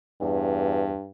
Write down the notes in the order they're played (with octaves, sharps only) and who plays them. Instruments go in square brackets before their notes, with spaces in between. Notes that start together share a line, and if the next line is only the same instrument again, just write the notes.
[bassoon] E2 [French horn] G2